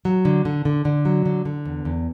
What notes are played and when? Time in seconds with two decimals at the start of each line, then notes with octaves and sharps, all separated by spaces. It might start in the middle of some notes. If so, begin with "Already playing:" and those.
0.05 F#3
0.25 D3
0.45 D3
0.65 D3
0.85 D3
1.05 F#3
1.25 D3
1.45 D3
1.65 E2
1.85 E2